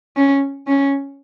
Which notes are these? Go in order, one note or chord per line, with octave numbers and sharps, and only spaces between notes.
C#4
C#4